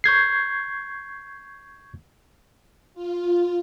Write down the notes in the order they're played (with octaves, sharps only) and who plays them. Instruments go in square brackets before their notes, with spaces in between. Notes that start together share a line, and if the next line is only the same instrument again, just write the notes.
[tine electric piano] C#6 G6 G#6 C7
[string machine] F4